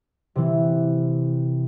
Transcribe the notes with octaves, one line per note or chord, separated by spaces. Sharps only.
C3 E3